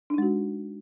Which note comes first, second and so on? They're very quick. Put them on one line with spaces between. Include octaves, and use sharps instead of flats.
D4 D#4 G#3 F#4